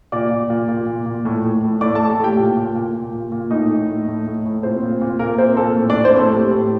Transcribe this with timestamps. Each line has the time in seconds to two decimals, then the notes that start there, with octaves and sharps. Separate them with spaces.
0.12 A#2 D5 D6
0.31 A#2
0.50 A#2
0.68 A#2
0.87 A#2
1.06 A#2
1.25 A2
1.44 A2
1.63 A2
1.81 A2 D5 D6
1.95 A4 A5
2.00 A2
2.10 A4 A5
2.18 A2
2.24 G4 G5
2.37 A#2
2.57 A#2
2.75 A#2
2.94 A#2
3.12 A#2
3.32 A#2
3.50 A2 D#4 D#5
3.69 A2
3.88 A2
4.07 A2
4.26 A2
4.45 A2
4.63 A#2 C4 C5
4.83 A#2
5.01 A#2
5.19 A#2 A#3 A#4
5.38 A#2 C4 C5
5.57 A#2 A4
5.76 A2
5.90 D4 D5
5.95 A2
6.04 C4 C5
6.14 A2 A4
6.33 A2 G4
6.52 A2